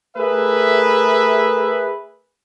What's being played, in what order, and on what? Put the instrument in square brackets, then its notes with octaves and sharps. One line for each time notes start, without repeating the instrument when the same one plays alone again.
[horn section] A3 G#4 A#4 B4 E5